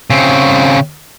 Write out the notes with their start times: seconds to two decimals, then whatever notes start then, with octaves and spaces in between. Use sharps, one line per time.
0.10 C#3 C4